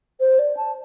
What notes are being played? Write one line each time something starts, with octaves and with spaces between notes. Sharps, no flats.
C5
D5
A5